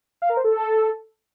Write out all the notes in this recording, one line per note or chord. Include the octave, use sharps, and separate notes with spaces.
F5
A#4
C5
A4